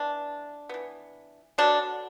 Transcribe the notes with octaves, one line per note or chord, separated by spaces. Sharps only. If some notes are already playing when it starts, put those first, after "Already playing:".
Already playing: E3 B3 D4
E3 B3
D3 F#3 B3 D4